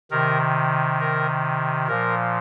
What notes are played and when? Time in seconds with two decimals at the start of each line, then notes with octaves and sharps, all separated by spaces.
0.11 C3 D#3 A#4
1.00 A#4
1.88 A#2 F3 A#4